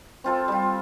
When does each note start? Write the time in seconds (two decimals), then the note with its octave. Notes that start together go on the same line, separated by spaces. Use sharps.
0.24 C4 F4 A4
0.48 G3 F4